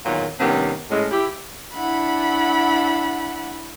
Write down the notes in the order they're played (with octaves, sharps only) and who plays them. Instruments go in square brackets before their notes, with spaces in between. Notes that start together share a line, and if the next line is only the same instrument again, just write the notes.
[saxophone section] E2 A#2 D#3 F#3
A2 C3 D#3 G3 B3 C#4
A2 G#3 C#4
E4 G4
[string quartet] D4 E4 F#5 B5